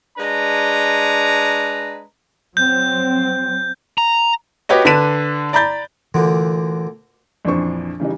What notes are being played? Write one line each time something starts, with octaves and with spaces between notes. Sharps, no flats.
G#3 D4 B4 A#5
F#3 C4 G6
A#5
F#4 G4 B4 C#5 D#5
D3 D4 B4 B6 D#7 E7
D5 A#5 B5 G6 A6
D2 A#2 D3 E3
A#1 F2 E3 D4 C5 C#6
C#3 E3 G3 D#4